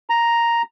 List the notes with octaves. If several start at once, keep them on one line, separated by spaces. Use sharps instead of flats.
A#5